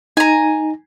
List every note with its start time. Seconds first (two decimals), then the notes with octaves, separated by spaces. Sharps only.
0.17 D#4 G#5 A#5